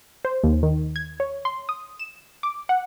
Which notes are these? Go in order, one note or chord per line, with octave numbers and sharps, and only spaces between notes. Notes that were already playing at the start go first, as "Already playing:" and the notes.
C5
D#2
D#3
G#6
C#5
C6
D#6
E7
D6
F#5